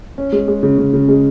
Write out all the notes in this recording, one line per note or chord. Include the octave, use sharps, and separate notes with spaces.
C#4
G#3
G#3
C#3
C#3
C#3
G#3